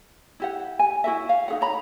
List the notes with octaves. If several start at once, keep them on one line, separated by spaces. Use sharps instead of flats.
E4 G4 F#5
G#5
E4 F#4 A#4 E5
F5
D#4 G#4 F#5
C#5 A#5 B5